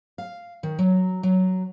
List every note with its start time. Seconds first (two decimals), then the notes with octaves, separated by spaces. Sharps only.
0.18 F5
0.63 D#3
0.79 F#3
1.23 F#3